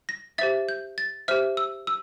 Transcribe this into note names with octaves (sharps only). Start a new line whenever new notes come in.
A#6
G4 C5 E5 A6
G6
A6
G4 C5 E5 F6
E6
E6